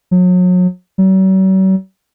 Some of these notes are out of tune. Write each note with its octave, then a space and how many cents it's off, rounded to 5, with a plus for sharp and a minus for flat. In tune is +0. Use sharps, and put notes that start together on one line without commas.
F#3 -35
F#3 +45